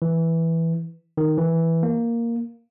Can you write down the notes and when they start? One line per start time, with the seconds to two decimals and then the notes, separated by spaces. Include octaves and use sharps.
0.02 E3
1.17 D#3
1.38 E3
1.83 A#3